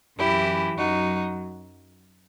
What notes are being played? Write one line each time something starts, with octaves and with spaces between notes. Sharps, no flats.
F#2 E3 E4 G4
F#2 F#3 D#4 F#4